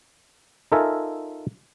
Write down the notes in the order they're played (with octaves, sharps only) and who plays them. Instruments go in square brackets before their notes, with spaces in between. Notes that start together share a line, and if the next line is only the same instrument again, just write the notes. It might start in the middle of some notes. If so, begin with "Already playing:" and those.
[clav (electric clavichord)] D#4 F4 A4 A#4 E5 G#5